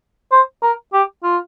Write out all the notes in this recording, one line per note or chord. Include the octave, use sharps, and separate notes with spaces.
C5
A#4
G4
F4